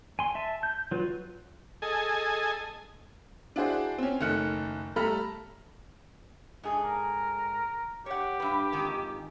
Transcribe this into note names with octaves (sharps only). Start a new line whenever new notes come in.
G#5 C6
E5 A5
G6
F#3 F4 B4
G#4 A4 D#5 G#5
D4 E4 F#4 G#4 C5
C4 C#4
F#1 D#3 A3 F6 F#6 C#7
G3 A3 A4 A#5 B5 F6
G#2 G#4 A4
A#4
G4 C#5 F#5
G2 B4
F2 G#2 D#3